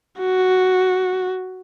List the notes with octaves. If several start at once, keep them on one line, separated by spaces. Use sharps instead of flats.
F#4